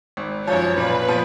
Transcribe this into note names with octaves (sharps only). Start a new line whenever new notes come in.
G#1
F#2 F3 C#5
A#2 B4
F3 B3